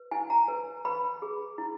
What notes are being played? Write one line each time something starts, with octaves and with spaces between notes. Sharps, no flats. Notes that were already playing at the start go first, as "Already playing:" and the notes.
Already playing: B4
E4 G#5
A#5
B4
B4 B5
G#4
E4